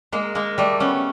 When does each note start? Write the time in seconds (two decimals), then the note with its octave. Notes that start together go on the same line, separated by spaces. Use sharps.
0.12 G#3 A#3
0.35 G#3 A#3
0.58 G3 A3
0.80 B3 C#4